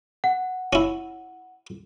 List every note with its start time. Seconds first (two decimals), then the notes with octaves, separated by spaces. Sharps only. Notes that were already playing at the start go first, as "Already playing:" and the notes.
0.24 F#5
0.73 C#4 E4